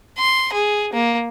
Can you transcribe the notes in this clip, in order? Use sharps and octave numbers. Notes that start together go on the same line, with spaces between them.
C6
G#4
A#3